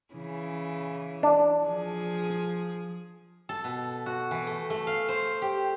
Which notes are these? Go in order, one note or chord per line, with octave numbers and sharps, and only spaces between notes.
C#3 E3
D4
F3 G#4
A4
B2
F#4
E3
A3
A3
F5
C5
G4